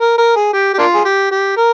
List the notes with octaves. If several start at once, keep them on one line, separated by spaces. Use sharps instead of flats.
A#4
A#4
G#4
G4
G4
A#3 D4 F4
G#4
G4
G4
A#4